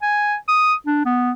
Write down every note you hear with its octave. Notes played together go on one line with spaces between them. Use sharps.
G#5
D#6
D4
B3